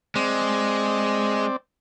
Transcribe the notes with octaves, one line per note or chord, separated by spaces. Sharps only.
G#3 C4 D5